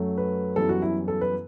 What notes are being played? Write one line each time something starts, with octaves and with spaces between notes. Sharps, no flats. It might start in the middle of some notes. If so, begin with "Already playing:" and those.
Already playing: F#2 F#3 A3
B4
F#2 E3 G3 B3 A4
F#4
E4
A4
B4